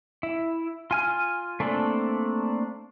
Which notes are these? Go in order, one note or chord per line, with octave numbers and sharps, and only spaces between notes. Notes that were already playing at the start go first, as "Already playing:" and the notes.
E4
F4 G#5 F6
A3 A#3 C4 D4 A4